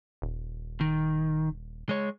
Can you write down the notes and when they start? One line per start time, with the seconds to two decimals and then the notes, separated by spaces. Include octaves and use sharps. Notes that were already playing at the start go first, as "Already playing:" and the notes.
0.22 D#1
0.81 D#3
1.89 G#3 C#5